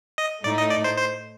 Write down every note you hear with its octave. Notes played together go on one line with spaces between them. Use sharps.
D#5
A2 A3 D#4 D5
D#5
D5
C5
C5